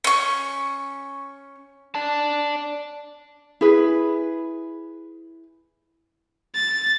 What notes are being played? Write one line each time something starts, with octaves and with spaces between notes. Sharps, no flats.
C#4 C#6
D5 A5
E4 G#4 B4
A6